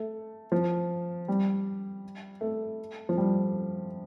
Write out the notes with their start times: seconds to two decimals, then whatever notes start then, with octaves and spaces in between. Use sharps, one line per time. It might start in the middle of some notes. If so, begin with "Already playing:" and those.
Already playing: A3
0.52 F3
1.28 G3
2.41 A3
3.09 F3
3.18 G3